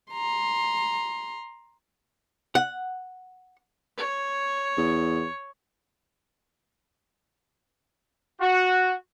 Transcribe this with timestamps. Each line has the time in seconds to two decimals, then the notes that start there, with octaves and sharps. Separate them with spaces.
0.12 A#5 C6
2.55 F#5
3.97 C#5
4.77 E2
8.40 F#4